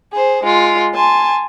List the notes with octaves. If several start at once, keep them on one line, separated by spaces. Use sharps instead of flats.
G#4 C5
G#3 F4
G#5 A5 C6